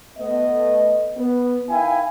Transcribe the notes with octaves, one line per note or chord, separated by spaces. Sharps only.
A3 B3 D#5
B3
D#3 E4 F5 G5 G#5